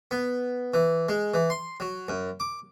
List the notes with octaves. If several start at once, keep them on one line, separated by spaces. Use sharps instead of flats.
B3
E3
G#3
E3
C6
F#3
F#2
D6